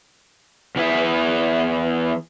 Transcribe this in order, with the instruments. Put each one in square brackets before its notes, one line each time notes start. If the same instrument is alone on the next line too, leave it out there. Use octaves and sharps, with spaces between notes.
[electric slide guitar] E2 E3 E4 G#4 E5